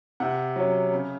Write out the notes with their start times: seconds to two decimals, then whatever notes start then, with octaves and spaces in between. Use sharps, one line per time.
0.20 C3 F#5
0.56 F#3 C#4
0.92 C#3